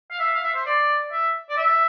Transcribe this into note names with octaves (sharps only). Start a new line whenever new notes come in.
F5
E5
F5
E5
C5
D5
E5
D5
E5